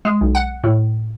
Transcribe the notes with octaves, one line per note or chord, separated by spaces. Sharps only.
G#3
B1
F#5
A2